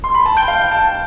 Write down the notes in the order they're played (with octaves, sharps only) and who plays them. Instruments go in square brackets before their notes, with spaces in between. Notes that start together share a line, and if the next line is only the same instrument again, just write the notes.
[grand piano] C6
B5
A5
[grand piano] G5 [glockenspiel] G6 D7 G7
[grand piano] F5
G5
A5